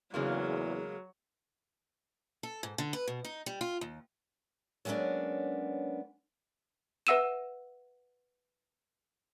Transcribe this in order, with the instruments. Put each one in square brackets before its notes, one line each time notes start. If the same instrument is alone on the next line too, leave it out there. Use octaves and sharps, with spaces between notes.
[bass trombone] E2 [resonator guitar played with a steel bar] C#3 G#3 A#3 [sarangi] F#3
[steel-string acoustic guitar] A4
G#2
D3
B4
B2
D#4
G3
F4
D#2
F#3 G#3 A#3 B3 C#4 D4
[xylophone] B4 E5 F#5 E6 D#7 E7